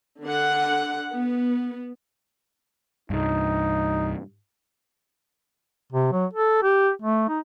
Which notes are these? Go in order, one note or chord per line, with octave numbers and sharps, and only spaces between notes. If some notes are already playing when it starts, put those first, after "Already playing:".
D3 F#5
B3
C2 G2 D#4
C3
F#3
A4
G4
A3
D#4